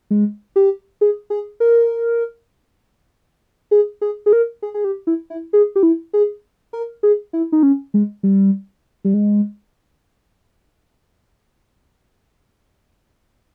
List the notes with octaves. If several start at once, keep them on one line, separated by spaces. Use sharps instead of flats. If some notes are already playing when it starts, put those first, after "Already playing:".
G#3
G4
G#4
G#4
A#4
G#4
G#4
G#4
A#4
G#4
G#4
G4
E4
E4
G#4
G4
E4
G#4
A#4
G#4
E4
D#4
C#4
G#3
G3
G3
G#3